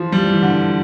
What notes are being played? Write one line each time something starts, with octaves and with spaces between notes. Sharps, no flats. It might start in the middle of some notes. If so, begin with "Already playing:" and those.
Already playing: E3 F3 F4
G3
E3
D3